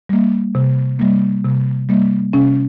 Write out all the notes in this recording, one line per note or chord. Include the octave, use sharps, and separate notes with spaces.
G3 A#3
C3
G3 A#3
C3
G3 A#3
C3 C#4